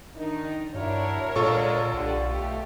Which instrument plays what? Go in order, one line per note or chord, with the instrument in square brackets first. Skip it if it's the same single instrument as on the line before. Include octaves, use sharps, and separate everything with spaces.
[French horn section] D#3 D#4 [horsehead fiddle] D4
[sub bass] G2 [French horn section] D4 E4 F#4 [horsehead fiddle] A#4 C#5
[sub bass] A#2 [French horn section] D3 G#3 [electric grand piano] F4 A4 C#6
[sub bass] B1 [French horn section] D3 [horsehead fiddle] G4
[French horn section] B2 A3 [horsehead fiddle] G4